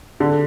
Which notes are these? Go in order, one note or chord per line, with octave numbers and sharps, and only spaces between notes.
D3